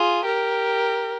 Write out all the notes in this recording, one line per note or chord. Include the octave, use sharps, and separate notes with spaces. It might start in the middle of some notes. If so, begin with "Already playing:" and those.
Already playing: F4 G#4
G4 A#4